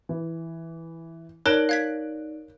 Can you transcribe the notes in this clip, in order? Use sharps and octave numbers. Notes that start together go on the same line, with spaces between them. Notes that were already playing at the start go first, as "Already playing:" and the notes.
E3
D#4 A#4 C#5 D5 A5 F#6 A#6 D7
F5 G#6 B6